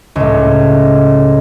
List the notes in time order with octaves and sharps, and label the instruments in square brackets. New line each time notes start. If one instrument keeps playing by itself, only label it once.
[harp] C#2 A2